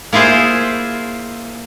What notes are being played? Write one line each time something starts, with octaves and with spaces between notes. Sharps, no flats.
A#3 E4 F4 G#4 C5